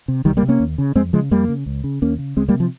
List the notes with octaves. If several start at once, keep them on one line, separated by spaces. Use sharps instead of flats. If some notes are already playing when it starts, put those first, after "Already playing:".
C3
C2 D#3 G3
G3 A#3
C3
A#3 C#4
D#2
C#3
F2 G#3 C4
C#3 F3 G#3
F2 G3 A#3
C#3
C#2
C#3
D#2 A#3 C#4
C#3
C#2 G#3 C4
G3 A#3
C3
F3